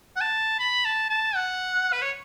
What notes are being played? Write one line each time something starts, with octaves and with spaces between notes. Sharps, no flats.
F#5
A5
B5
A5
A5
F#5
B4
C#5